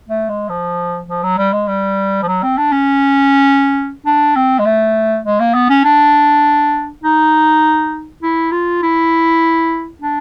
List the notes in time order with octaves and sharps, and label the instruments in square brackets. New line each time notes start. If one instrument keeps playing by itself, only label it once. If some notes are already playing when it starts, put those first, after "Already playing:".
[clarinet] A3
G#3
F3
F3
F#3
G3
G#3
G3
F3
F#3
C4
D4
C#4
D4
C4
G#3
A3
G#3
A#3
B3
C#4
D4
D#4
E4
F4
E4
D4